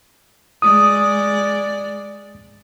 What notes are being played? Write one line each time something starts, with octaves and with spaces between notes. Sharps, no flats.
G#3 D5 D#6